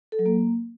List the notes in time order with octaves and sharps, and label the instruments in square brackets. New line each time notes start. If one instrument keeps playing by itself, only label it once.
[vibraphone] A4
F#3
A#3